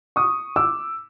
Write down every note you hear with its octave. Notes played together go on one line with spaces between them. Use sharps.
C#6 D#6
D6 E6